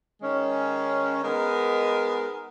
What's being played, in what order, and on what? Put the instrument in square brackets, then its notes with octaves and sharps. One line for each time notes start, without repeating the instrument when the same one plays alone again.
[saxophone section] D#3 G#3 C#4
G#3 B3 D#4 A#4